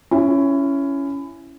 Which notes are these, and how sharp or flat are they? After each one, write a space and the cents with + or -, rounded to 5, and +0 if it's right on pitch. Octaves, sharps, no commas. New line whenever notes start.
C#4 +5 E4 +20